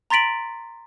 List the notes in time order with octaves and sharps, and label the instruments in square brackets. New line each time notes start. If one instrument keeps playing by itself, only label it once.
[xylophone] A#5 C6 A6 B6 D7 F#7